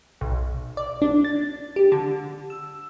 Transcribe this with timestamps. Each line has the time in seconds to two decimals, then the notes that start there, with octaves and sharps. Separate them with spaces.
0.21 B1
0.77 D5
1.02 D4
1.25 A6
1.76 G4
1.92 D3
2.50 E6